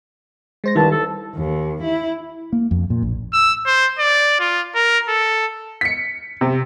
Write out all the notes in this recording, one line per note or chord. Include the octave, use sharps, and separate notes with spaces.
G#3 C5 A#6
C2 G2 D#3 G3 E4 A5
A4
D#2
E4
A#3
F2
A#2
A#1
E6
C5
D5
F4
A#4
A4
B6 C#7
C3